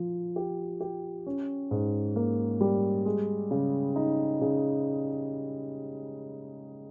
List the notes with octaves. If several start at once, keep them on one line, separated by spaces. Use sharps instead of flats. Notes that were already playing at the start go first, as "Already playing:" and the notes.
Already playing: F3
G4
G4
C#4
G#2
A#3
G3
G#3
C#3
D#4
C#3